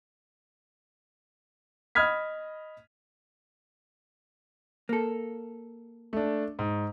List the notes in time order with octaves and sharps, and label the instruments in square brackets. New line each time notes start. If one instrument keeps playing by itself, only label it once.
[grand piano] D#5 B5 D#6 F6 G#6 B6
[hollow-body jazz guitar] A#3 A4
[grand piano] A3 D4
G#2